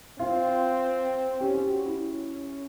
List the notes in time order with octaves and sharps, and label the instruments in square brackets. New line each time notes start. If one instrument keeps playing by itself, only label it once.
[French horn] C4 [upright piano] F4
[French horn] C#4 [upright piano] G4
[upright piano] G4
F#4
E4